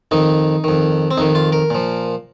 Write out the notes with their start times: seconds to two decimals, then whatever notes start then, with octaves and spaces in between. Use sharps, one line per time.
0.11 F2 D#3 D#4
0.64 F2 D#3
1.11 C4
1.18 F2 D#3 D#4
1.35 F4
1.52 A#4
1.70 A#2 F3